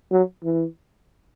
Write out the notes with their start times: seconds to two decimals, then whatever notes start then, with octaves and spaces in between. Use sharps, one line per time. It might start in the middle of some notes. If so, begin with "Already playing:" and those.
0.12 F#3
0.44 E3